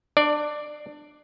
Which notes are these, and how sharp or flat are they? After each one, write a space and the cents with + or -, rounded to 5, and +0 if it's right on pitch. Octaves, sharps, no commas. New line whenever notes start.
D4 +25 D5 +0